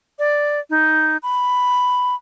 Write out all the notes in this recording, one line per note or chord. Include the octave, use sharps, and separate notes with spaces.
D5
D#4
B5